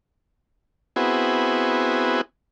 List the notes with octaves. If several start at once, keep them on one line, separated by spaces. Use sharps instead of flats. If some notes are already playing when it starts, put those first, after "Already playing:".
B3 C4 E4 F#4 G#4